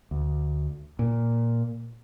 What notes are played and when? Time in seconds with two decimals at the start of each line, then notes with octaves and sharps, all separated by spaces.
0.11 D2
0.99 A#2